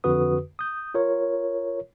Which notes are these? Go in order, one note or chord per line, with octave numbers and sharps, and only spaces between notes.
F2 D3 F#4 B4 D#6
D#6 G6
F4 A#4 C#5